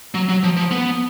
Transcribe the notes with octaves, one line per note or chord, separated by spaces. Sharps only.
F#3
F#3
F3
F3
B3